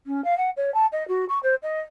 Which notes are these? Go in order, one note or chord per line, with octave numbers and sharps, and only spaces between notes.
C#4
F5
F#5
C#5
A5
D#5
F#4
C#6
C5
D#5